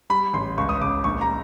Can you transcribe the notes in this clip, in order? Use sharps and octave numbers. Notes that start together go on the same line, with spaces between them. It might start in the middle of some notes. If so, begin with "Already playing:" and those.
G3 B5
A1 C6
C#2 C#6
D#6
C#2 D6
A#1 C#6
A#5